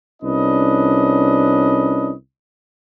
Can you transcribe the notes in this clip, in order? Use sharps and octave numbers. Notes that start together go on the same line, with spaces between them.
C2 C#4 D4 B4 D#5